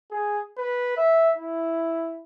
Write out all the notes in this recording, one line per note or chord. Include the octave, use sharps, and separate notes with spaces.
G#4
B4
E5
E4